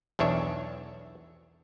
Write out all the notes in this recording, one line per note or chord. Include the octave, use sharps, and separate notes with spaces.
B1 E2 D4 C#5 E5